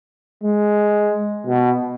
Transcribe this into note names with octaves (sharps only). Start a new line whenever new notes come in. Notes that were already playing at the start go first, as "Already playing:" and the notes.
G#3
B2